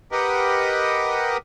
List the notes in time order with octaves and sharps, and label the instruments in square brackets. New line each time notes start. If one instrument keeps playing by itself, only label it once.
[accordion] G4 A#4 B4 D#5 F#5